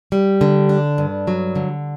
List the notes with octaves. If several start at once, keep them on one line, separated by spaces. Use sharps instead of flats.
G3
D3
D4
G2
F#3
D3